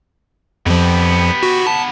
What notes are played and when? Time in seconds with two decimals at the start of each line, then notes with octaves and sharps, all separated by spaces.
0.66 F2 F3 B3 G4
1.43 F#4
1.67 A5